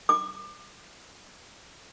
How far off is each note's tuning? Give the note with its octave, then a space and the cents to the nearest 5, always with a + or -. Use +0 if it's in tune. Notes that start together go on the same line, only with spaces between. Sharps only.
D6 +30